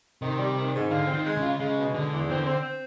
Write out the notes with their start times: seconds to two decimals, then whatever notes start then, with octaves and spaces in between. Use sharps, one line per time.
0.22 C3 D#3
0.39 G3
0.56 D#3
0.74 G#2
0.90 D3 F4
1.08 C4
1.13 D#3
1.26 G#3
1.37 C#3
1.42 F4
1.60 C#3 G#3
1.77 B2
1.94 D3 G#3
2.12 E2
2.29 D3 C4
2.46 C4
2.63 C4